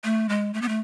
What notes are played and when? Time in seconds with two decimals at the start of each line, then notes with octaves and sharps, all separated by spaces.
0.04 A3
0.29 G#3
0.54 A3
0.62 B3
0.69 A3